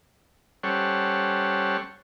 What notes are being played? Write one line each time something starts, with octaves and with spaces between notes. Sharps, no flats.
G3 C#4 A4 C5 C#5 F#5